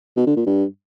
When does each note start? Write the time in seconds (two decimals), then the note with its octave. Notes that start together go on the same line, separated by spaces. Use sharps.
0.17 B2
0.27 D3
0.36 A#2
0.46 G2